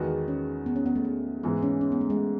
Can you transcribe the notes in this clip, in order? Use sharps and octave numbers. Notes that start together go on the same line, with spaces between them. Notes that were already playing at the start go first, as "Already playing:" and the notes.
Already playing: E2 D#3 G#3 B3 F#4
C#4
B3
C#4
B3
A3
B3
G#2 E3 G#3 B3
C#4
C#4
B3
A3
G#3